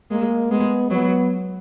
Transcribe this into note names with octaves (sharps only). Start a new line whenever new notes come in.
G#3 A#3
G#3 B3
F#3 B3